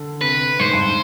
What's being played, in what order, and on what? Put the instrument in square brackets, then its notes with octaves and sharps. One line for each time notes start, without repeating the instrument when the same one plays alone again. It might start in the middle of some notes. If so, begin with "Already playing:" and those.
Already playing: [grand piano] D3
[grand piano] C3 [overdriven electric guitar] B4
[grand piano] G#2 [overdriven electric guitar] C5
[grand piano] G2